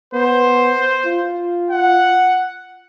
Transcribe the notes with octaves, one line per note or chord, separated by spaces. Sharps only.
B3 C5
F4
F#5